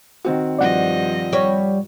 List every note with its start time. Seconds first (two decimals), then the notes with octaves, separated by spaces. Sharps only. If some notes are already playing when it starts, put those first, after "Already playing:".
0.25 D#3 C4 F#4
0.59 G2 F3 D5 D#5 F#5
1.33 G3 C#5